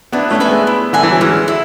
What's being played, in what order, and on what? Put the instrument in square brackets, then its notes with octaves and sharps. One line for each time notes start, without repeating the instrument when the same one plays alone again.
[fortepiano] B3 D4 [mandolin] E4
[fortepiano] A3 C#4
[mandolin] B4 E5 G#5
[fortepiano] G#3 B3
[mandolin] E4
[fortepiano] D3 [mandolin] B4 E5 G#5
[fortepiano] E3
F#3
[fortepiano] E3 G#3 [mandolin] C#4
[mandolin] E4